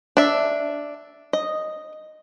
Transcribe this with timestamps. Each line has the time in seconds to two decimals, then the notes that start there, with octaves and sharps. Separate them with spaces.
0.17 D4 E5
1.33 D#5